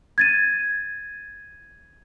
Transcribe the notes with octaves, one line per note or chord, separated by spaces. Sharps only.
G#6 A6 D#7